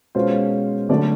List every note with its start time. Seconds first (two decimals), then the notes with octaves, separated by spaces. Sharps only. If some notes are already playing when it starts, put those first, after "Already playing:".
0.15 B2 G#3 C#4 F4 C5
0.89 D3 F#3 A3 D5